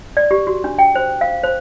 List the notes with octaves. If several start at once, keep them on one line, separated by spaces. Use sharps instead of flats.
D5
G4
F#4
D4
G5
C5
F5
C5